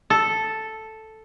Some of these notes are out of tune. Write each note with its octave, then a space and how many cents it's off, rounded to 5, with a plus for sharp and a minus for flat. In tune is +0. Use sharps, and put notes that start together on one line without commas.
A4 +0